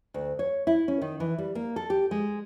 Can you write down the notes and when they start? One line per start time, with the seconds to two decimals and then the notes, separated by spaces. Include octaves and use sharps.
0.14 D2
0.39 C#5
0.67 E4
0.88 C#4
1.01 D#3
1.20 E3
1.38 G3
1.55 A#3
1.76 A4
1.90 G4
2.11 G#3